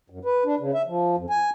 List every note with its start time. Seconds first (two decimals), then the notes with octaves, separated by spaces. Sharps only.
0.10 F#2
0.25 B4
0.46 D4
0.60 C#3
0.74 E5
0.87 F3
1.17 F2
1.30 G#5